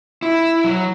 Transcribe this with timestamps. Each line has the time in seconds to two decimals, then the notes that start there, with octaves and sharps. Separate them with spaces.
0.22 E4
0.64 F#3